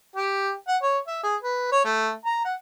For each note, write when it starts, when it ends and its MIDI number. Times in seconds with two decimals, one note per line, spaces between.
0.16 0.51 67
0.68 0.77 78
0.83 0.99 73
1.07 1.20 76
1.24 1.35 68
1.43 1.67 71
1.72 1.82 73
1.84 2.11 57
2.25 2.44 82
2.45 2.54 78